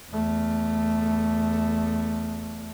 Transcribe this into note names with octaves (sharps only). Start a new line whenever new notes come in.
E2 A3